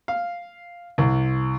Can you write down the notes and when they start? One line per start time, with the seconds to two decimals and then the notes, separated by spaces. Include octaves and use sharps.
0.08 F5
0.98 C2